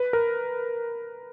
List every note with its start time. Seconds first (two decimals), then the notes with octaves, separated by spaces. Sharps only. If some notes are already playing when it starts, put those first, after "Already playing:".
Already playing: B4
0.13 A#4